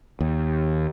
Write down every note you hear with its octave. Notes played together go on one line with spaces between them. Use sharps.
D#2